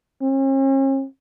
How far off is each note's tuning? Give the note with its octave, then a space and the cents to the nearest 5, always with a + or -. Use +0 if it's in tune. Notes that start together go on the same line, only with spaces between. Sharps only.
C#4 -45